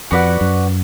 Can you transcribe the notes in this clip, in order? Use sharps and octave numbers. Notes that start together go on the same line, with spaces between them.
F2 F#4 B4 D5 F#5
F#2